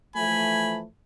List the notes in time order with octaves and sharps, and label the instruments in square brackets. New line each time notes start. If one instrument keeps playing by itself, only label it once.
[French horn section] E3 F3 A3 [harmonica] G#5 B5